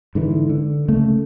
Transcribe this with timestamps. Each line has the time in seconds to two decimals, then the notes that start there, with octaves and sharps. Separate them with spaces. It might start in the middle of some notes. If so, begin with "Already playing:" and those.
0.15 G#2 D3 E3
0.50 D3
0.88 C#3 A3 A#3